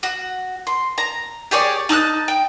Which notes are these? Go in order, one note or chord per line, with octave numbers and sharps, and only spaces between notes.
F#4
C6
A#5
G4 G#4 C#5 D5
D#4 A5 E6 F#6
G5